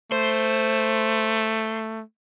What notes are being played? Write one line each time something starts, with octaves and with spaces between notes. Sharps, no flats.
A3 C5